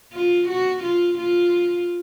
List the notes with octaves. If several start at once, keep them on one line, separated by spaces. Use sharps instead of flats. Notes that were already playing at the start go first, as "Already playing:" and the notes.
F4
F#4
F4
F4